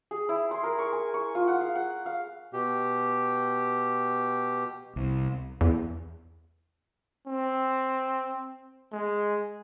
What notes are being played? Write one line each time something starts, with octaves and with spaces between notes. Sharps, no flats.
G#4
E4
C6
A#4
C#6
G#5
C#6
F4
F#5
F5
F#5
F5
B2 G4
C2
E2
C4
G#3